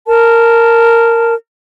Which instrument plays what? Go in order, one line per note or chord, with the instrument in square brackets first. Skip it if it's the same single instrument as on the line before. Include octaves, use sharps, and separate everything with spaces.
[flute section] A#4 A5